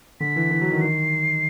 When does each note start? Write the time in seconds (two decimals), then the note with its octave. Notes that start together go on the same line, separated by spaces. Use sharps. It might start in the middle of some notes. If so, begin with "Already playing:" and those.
0.20 D3 B6
0.36 E3
0.51 E3
0.61 F#3
0.71 D#3
0.81 D#3 C7